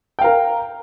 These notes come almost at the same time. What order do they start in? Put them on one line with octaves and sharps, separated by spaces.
G5 F5 A#4